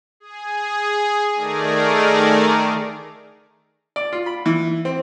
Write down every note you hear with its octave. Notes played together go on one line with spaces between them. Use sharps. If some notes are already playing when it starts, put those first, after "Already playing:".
G#4
D#3 A3 G#4 A#4 D5
D5
F4
B5
E3
C4